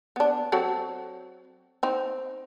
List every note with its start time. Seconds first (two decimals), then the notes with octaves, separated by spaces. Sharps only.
0.16 B3 D4
0.52 F#3 C4 A4
1.83 C4 D#4